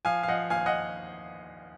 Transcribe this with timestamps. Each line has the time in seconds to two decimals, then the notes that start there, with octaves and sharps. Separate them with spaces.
0.05 F3 F5 G#5
0.23 F5
0.28 F3 D#5 F#5
0.50 D#2 F5 G#5
0.66 D#5 F#5